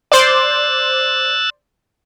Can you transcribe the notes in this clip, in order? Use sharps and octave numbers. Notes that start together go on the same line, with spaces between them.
C5 D5 E6 F#6 A6